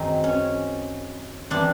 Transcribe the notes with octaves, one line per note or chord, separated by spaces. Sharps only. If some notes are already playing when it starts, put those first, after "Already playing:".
Already playing: F#2 D#3 G#3 C4 D#4
C#4
E3 G3 C4 D4